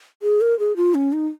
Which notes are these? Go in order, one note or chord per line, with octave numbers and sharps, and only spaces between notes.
G#4
A#4
G#4
F4
C#4
D#4